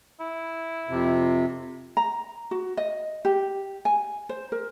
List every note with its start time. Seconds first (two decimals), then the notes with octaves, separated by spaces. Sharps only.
0.20 E4
0.89 F2 C3
1.97 A#5
2.51 F#4
2.77 D#5
3.25 G4
3.85 G#5
4.29 C5
4.52 A#4